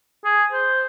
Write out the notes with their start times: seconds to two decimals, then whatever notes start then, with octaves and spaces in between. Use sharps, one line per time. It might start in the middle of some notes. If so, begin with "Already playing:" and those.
0.25 G#4
0.52 C5